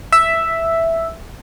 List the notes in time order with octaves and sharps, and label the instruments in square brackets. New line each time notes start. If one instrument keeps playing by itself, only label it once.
[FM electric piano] E5